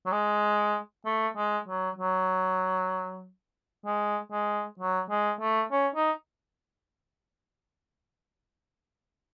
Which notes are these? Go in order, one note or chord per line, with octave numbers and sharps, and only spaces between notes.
F#3
G#3
A3
G#3
F#3
F#3
G#3
G#3
F#3
G#3
A3
C#4
D#4